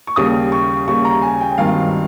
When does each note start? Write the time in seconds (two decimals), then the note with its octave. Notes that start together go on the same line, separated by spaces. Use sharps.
0.07 C#6
0.16 D#2 C#3 G3 D#6
0.52 C#6
0.87 D#2 C#3 G3 C#6
1.05 A#5
1.22 G#5
1.40 G5
1.58 G#1 G2 D#3 G3 C4 F5